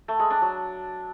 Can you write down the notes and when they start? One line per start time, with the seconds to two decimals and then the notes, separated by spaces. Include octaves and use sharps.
0.08 A3
0.19 G#3
0.30 D4
0.42 F#3